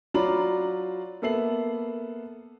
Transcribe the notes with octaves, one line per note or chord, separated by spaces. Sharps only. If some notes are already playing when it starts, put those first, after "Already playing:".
F#3 F4 D5 A#5 B5 F#7
A#3 B3 A4 E5 C7 F#7